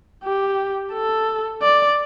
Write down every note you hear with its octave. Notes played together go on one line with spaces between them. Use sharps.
G4
A4
D5